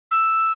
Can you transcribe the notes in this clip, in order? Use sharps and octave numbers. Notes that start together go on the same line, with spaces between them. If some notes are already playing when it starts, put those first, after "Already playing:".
E6